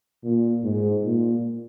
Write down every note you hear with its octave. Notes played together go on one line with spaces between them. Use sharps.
A#2
G#2
A#2